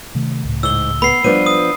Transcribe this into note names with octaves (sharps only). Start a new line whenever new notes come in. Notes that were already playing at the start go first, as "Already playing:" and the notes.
C3 D#3 A3
C#2 A2
G#2 E6 G7
B3 B5 C7
F3 G3 B3 D4 D#7
D#6